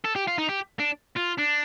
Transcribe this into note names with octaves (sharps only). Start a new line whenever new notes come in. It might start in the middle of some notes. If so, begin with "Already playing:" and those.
A4
G4
F4
D#4
G4
D4
F4
D4